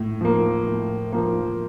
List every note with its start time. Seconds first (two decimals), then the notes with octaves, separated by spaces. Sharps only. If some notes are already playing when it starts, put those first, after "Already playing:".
Already playing: A2
0.21 F3 A#3
0.67 A2
1.13 F3 A#3